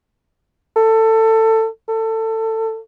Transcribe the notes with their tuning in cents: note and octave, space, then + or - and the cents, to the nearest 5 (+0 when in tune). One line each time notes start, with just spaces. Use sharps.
A4 +20
A4 +20